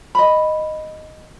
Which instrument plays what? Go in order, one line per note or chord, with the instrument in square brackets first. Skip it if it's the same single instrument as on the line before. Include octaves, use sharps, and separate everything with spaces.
[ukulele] D#5 B5